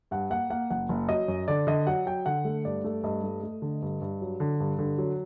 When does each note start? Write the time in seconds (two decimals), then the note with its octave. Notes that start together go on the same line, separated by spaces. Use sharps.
0.11 G2 F#5
0.30 A#3 F#5
0.50 A#3 F#5
0.70 F#1 F#5
0.89 F#1
1.09 F#3 D#5
1.28 F#2
1.48 D3 D5
1.67 D3 D#5
1.87 F#3 F#5
2.06 F#3 G5
2.26 D3 F#5
2.45 A3
2.65 G2 D5
2.84 A3
3.03 G2 D#5
3.24 A3
3.43 A3
3.62 D3
3.82 G2
4.01 G2
4.21 F#3
4.40 D3
4.60 G2
4.79 D3
4.98 F#3